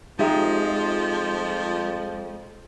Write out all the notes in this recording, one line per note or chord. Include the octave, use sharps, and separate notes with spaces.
F2 F3 G#3 D#4 G4 E5